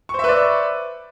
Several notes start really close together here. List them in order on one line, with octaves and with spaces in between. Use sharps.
C#6 C5 E5 B4 D5